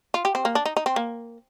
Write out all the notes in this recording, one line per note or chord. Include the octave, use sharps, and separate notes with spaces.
F4
G4
C4
A#3
D4
D#4
D#4
C4
A#3